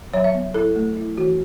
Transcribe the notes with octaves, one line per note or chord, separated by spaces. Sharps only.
F#3 C#5
E5
B3
E4 A4
A3
E4
E3 F#4